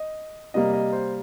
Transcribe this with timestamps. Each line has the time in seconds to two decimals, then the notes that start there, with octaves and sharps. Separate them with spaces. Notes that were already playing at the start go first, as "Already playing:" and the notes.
Already playing: D#5
0.54 C3 G3 A#3 D#5
0.73 D#5
0.92 C5